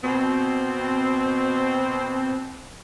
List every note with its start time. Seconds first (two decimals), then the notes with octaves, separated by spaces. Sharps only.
0.04 B2 C4